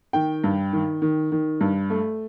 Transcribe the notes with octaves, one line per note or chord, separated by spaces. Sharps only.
D#3 G5
G2
D#3
D#3
D#3
G2
A3